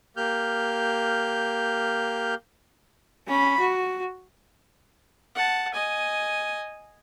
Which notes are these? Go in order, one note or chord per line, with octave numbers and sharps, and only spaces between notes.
A#3 G4 F6 G6
C#4 B5
F#4
F#5 A5
D#5 G#5